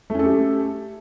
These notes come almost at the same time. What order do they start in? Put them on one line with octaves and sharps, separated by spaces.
A3 C#4 A4 G4